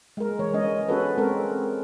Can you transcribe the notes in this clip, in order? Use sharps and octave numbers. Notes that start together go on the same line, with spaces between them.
G#3 A#4
E3 G#3 C#5
G#3 C#4 D#5
C#4 F#4 A4 B4
G#3 C4 A4 A#4